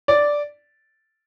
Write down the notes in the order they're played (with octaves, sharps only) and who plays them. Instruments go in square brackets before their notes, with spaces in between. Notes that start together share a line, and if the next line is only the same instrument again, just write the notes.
[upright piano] D5